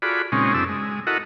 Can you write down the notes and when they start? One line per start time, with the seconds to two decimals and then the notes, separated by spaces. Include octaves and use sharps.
0.02 F4 F#4 G#4 A4 D5 B5
0.32 A#2 C#3 G#3 C4 C#4 D#4
0.54 F#2 C4 D4 E4 A4 E6
0.69 G#3
1.07 E4 F#4 A4 A#4 D#5 F#5